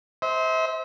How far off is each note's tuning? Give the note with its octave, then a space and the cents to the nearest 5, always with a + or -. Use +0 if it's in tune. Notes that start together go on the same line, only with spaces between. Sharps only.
C5 -5 E5 -40